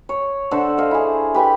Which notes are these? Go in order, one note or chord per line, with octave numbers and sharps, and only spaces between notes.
C#5
D3 A4 C5 F#5
D#5 F5
E4 G#4
G4 B4 G5 G#5